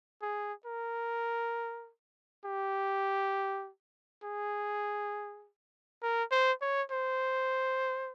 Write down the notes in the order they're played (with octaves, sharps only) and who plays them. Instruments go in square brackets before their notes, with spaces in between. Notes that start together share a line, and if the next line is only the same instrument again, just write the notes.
[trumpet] G#4
A#4
G4
G#4
A#4
C5
C#5
C5